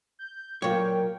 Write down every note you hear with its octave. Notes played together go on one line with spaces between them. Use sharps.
G6
A#2 F#3 A#4 C#5 G5